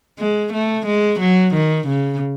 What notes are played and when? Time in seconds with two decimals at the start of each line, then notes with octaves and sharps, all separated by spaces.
0.19 G#3
0.53 A3
0.86 G#3
1.20 F#3
1.54 D#3
1.87 C#3